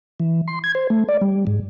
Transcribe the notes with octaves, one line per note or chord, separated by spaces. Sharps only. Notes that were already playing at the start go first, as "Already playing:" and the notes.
E3
C6
G#6
C5
A3
D5
G3
G#2